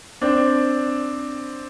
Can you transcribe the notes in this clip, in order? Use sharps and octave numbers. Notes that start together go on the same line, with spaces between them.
C4 D4